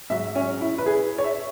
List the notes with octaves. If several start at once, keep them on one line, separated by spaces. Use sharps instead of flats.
G#2 F#3 E5
C#4
E4
B4
G#4
C#5
E5